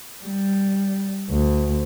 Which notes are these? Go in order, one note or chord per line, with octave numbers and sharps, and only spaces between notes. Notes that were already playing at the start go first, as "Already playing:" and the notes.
G3
D2